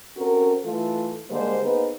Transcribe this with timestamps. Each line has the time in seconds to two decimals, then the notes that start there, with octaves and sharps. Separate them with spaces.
0.17 C4 C#4 F#4 A4 A#4
0.64 E3 A3 F4 A4
1.30 D3 G3 G#3 A#3 C5
1.62 A#3 B3 D#4 G#4 B4 C5